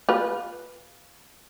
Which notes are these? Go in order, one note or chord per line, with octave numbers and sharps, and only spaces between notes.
F4 B4